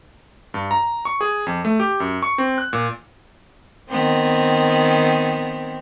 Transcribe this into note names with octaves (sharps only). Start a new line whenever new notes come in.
G2
A#5
C#6
G#4
F2
A3
G4
F#2
C#6
C4
F#6
A#2
D#3 B3 C4